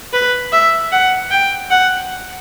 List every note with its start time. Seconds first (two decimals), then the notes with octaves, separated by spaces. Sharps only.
0.13 B4
0.52 E5
0.92 F#5
1.31 G5
1.71 F#5